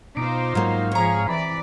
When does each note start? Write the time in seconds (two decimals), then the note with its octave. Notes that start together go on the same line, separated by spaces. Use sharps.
0.17 B2 D#4 F4 C5 D6
0.55 G#2 F#3 A#3 F5
0.92 C3 F3 G#4 C#5 A#5
1.28 E3 D5 B5